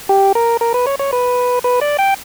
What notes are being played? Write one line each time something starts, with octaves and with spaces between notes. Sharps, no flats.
G4
A#4
A#4
B4
C#5
C#5
B4
B4
D5
G5